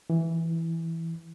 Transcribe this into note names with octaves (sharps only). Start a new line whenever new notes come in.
E3